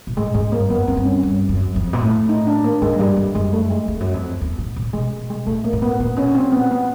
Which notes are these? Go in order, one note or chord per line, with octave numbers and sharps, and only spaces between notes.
A#2
A2 G#3
G#2 G#3
G2 A#3
F#2 B3
F#2 C4
G2
C#4
G2
F#2
F2
A#2
A2
D#4
D4
A#3
G#2 G#3
F#2
G2 G3
G2
F#2 G#3
A3
G#3
F2
F#2
F2
E2
A2
A#2
B2 G#3
G#3
A#2 A3
A#3
A2
B3
A#2 B3
B2 C#4
A#2
C4
B3
B3